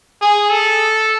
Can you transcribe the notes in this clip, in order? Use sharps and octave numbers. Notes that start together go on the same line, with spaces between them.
G#4
A4